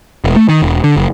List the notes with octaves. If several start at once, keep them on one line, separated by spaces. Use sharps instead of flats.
E1
A3
D#3
E1
D3
F#1